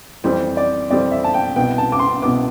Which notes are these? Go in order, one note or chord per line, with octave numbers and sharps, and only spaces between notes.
F2 E3 G3 C4 C5
D5
F2 E3 G3 C4 D5
E5
A5
G5
C2 B2 B3 G5
A5
D6
C6
C2 B2 B3 D6